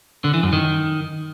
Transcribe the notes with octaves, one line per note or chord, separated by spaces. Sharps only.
D3
E3
F#2
D#3